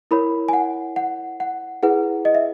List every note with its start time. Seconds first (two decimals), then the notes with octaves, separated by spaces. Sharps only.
0.11 E4 A#4 C#5 B5
0.49 G#5
0.53 F#5
0.96 F#5
1.40 F#5
1.83 E4 G#4 B4 F#5
2.25 D#5
2.35 E5